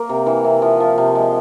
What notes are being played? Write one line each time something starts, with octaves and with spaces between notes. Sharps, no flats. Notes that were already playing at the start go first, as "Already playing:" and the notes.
Already playing: A#3
C3
E3
C3
F3
F3
C3
G#3